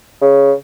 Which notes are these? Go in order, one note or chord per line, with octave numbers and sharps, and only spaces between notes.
C#3